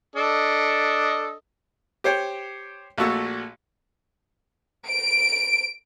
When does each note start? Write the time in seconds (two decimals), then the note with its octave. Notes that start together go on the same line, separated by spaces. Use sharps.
0.16 D4 A4 D#5
2.04 G4 C5 C#5 G5
2.98 A#1 A#2 A3 F#4 E6
4.89 D7